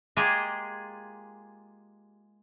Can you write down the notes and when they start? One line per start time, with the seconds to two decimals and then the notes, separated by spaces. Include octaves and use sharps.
0.17 G#3 A#3 F4 G4 G#4